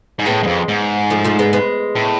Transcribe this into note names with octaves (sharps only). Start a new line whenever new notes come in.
G#2
A2 G#3 B3
G#2
F2
G#2
F3 A3
F3 A3
G#3 B3
G#3 B3
A2